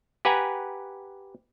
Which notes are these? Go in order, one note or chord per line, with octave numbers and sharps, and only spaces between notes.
G4 B4 F#5 G#5 A#5